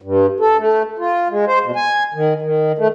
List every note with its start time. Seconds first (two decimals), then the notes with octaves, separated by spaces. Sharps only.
0.02 G2
0.40 A4
0.58 A3
0.99 F4
1.30 G#3
1.47 C5
1.64 B2
1.76 G#5
2.14 D#3
2.42 D#3
2.78 A3